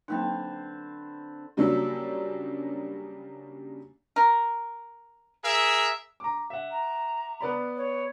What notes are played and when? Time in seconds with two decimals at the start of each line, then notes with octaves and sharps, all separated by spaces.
0.08 D3 F#3 A#3 C4 D#4 B4
1.57 C#3 F#3 G3 A#3 D4 E6
4.16 A#4
5.44 G#4 A#4 E5
6.20 A#5 D6
6.50 E5 F#5
6.71 A#5
7.41 B3 D5 B5
7.77 C#5